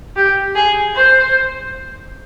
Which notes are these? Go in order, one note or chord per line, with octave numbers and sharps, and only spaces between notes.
G4
G#4
C5